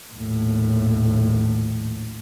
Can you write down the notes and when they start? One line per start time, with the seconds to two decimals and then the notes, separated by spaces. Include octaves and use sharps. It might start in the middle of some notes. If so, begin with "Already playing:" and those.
0.16 A#1 D#2 A2